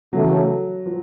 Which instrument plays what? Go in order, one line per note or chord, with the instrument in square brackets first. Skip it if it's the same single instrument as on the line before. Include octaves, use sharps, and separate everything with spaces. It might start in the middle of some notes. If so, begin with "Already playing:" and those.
[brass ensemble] C#3 E3 A3 [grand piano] F#3
[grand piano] F3